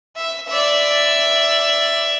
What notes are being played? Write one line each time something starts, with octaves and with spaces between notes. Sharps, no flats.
E5
D5 E5